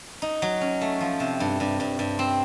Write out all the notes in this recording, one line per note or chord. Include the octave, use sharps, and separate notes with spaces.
D#4
F#3
C#4
A3
F3
C3
G2
G2
G2
G2
C4